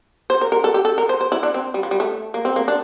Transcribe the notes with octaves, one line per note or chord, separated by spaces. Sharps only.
C5
A#4
A#4
A4
G4
A4
A#4
C5
C5
E4
D4
C4
G3
F3
G3
A3
A#3
C4
A#3
D4